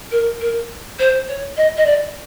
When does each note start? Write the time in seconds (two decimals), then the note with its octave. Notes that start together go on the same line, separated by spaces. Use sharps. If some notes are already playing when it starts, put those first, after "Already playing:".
0.11 A#4
0.40 A#4
0.98 C5
1.27 C#5
1.57 D#5
1.77 D#5
1.85 D5